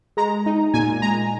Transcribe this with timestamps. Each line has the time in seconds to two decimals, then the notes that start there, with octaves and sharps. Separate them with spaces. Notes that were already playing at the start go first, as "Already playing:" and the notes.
0.17 G#3 A#5
0.46 D#4
0.74 A#2 G#5
1.02 G#3 A#5